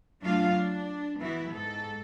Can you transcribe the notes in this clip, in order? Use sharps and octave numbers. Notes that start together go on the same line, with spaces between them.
F#3 A3 D4 F4 F5
D4
E3 B3 E4 F#4
G#2 A4